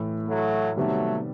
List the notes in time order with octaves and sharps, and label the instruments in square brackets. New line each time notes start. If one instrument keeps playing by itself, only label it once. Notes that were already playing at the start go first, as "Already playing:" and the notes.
Already playing: [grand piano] A2 E3 A3
[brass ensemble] F#3 A3
[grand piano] C3 D#3 G3 B3 [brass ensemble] F#3 A3